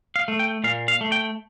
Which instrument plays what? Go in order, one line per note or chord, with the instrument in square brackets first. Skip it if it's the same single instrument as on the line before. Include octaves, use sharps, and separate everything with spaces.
[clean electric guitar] F5
A3
G5
A#2 F5
F5
A3
G5